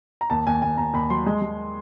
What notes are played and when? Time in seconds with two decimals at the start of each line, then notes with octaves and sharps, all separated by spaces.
0.21 A#5
0.30 D#2 A5
0.47 D#2 G#5
0.62 D#2 G#5
0.78 D#2 A#5
0.93 D#2 B5
1.10 F#3 C6
1.26 G#3
1.42 G#3